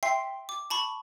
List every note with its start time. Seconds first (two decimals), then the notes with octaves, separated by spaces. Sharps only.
0.03 E5 G5 C6 C7
0.49 D6
0.70 A5 B5 C#6